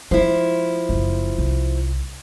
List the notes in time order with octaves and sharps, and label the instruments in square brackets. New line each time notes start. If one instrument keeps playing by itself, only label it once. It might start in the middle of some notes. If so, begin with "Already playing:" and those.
[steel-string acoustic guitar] F3 E4 [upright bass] G#3
[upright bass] F#1
C2